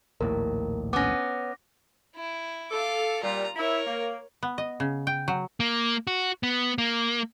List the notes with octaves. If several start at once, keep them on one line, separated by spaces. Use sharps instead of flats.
A#1 D#2 A2 A#4
B3 C#4 D6 A#6
E4
A4 F5 D6
A#2 G3 F4 A#5
E4 A#4 C#5
A#3
B3
D#5
C#3
G5
F#3
A#3
F#4
B3
A#3